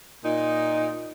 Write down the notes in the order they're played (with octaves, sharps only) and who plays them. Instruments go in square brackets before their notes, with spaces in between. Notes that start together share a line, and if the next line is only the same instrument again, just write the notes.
[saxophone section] A#2 D#4